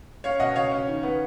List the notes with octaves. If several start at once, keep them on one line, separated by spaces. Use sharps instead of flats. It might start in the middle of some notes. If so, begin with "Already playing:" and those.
C#4 C#5 F5
B2 D#5 F#5
C#3 C#5 F5
C#4
D#3
B3